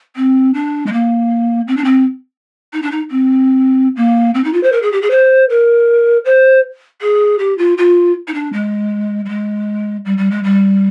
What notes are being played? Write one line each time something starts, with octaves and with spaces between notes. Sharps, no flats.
C4
D4
G#3
A#3
C4
D4
C4
D#4
D4
D#4
C4
A#3
C4
D#4
F4
C5
A#4
G#4
G4
G#4
C5
A#4
C5
G#4
G4
F4
F4
D#4
D4
G#3
G3
G#3
G3
G3
G#3
G3